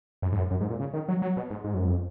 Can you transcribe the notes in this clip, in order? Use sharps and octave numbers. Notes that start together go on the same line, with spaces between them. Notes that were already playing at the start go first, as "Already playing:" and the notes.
F#2
G#2
F#2
F#2
G#2
A#2
C#3
D#3
F#3
F#3
B2
G#2
G#2
F#2
F2